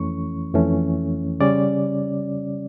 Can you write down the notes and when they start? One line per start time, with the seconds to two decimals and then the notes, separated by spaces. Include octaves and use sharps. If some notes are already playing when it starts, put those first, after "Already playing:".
Already playing: F2 E3 A3 C#4 C#6
0.54 F2 E3 A3 C#4
1.40 C#3 G3 C#4 D5